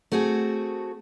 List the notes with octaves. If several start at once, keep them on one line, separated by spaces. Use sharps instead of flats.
A3 C4 F#4 G#4 A4